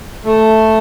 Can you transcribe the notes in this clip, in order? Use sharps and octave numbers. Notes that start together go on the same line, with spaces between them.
A3